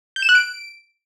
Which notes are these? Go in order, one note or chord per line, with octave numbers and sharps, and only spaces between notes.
G6
E7
F#6
D7